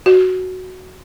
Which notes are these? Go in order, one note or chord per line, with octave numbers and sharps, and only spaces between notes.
F#4